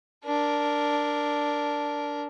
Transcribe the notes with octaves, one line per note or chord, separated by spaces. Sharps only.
D4 A#4